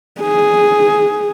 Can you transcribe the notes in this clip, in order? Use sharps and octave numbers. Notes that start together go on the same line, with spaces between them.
G#4